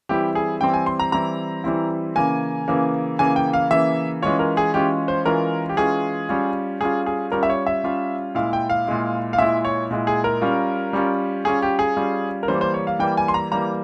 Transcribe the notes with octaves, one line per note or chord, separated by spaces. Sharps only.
E3 G3 C4 E4 G4
G#4
E3 G3 C4 E4 G5
G#5
C6
A#5
E3 G3 C4 E4 A#5
E3 G3 C4 E4
C#3 E3 A#3 G#5
C#3 E3 A#3
C#3 E3 A#3 G#5
G5
F5
C#3 E3 A#3 E5
E3 G#3 C#4 F4 C#5
A#4
G#4
E3 G#3 C#4 F4 G4
C5
E3 G#3 C#4 F4 A#4
G4
E3 G#3 C#4 F4 G#4
G3 C#4 F4
G3 C#4 F4 G#4
G#4
G3 C#4 F4 A#4
E5
C#5
E5
G3 C#4 F4
A#2 G#3 E4 F5
G5
F5
A#2 G#3 E4
F5
A#2 G#3 E4 E5
C#5
A#2 G#3 E4
G#4
A#4
G3 C#4 F4
G3 C#4 F4
G3 C#4 F4 G#4
G4
G#4
G3 C#4 F4
A#4
E3 G3 A#3 C5
C5
C#5
F5
E3 G3 A#3 G5
G#5
C6
A#5
E3 G3 A#3 A#5